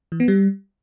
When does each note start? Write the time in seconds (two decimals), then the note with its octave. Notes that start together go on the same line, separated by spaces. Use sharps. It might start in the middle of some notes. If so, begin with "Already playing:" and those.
0.12 E3
0.20 B3
0.28 G3